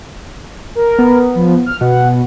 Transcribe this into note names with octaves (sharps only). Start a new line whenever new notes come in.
A#4
B3
F3
F6
B2 F#5